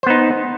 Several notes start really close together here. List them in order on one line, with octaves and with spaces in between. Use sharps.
C5 B3 D#4